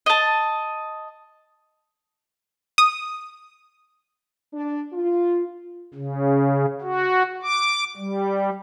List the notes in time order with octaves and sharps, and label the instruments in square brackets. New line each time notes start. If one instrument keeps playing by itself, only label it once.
[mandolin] D#5 A5
[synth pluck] D#6
[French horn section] D4
F4
[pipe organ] C#3
F#4
D6
G3